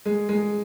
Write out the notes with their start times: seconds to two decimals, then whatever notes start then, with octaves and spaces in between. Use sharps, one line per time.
0.05 G#3
0.29 G#3